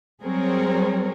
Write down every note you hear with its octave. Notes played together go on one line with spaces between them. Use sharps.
F#3 G3 C4 G#4 A#4 C#5